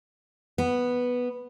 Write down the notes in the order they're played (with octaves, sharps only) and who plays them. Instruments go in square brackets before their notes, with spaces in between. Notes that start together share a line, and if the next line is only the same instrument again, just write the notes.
[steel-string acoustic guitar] B3